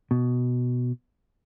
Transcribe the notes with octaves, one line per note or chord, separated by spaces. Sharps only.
B2